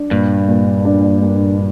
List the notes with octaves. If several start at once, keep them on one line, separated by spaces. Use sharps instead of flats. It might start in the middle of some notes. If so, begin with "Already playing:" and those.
Already playing: D4
G2 A#2
A#2
D4
A#3